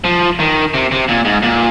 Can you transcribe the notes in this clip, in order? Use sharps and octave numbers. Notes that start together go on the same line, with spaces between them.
F3
D#3
C3
C3
A#2
G#2
A#2